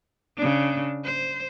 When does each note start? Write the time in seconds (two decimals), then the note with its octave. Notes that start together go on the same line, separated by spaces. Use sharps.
0.37 C#3 D4
1.05 C5